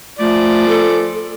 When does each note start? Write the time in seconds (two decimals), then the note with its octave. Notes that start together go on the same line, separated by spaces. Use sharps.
0.19 F3 A3 D5
0.68 A4